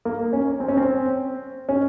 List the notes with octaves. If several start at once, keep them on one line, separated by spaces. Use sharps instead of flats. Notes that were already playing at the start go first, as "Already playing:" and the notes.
A#3
C#4
C4
C#4
C4
C#4